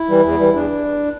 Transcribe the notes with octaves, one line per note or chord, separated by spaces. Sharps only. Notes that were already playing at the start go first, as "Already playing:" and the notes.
Already playing: E4
E3 G3
E2
E3 G3
E2 D4